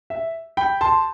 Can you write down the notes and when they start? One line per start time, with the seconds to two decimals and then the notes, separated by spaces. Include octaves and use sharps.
0.10 E5
0.57 G5 B5
0.81 A5 C6